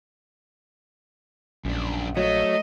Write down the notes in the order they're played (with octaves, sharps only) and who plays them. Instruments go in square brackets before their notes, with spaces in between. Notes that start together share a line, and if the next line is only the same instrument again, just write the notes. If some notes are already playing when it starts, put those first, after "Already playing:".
[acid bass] A#1 [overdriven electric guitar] F#2 D4
[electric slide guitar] F#3 [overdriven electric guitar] A3 [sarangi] D#5